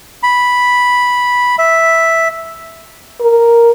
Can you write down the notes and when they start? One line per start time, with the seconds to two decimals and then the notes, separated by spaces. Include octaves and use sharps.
0.23 B5
1.59 E5
3.21 A#4